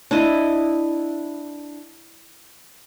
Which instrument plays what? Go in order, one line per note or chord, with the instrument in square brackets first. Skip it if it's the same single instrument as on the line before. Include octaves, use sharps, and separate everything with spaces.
[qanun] D4 E4 D#5